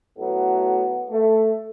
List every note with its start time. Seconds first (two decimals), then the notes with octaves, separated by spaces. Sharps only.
0.16 A2 F#3 A3 B3
1.10 A3